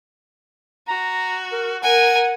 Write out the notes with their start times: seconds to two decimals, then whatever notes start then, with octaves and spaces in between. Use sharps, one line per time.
0.88 F#4 A#5
1.52 A#4
1.83 A#4 F#5 G#5